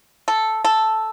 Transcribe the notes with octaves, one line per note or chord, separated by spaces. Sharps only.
A4
A4